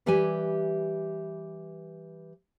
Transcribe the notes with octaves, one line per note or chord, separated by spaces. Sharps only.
E3 G3 G4 B4 E5 G#5